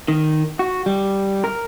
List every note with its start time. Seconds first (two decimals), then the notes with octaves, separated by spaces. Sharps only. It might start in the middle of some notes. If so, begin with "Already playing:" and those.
0.08 D#3
0.59 F#4
0.86 G3
1.44 A#4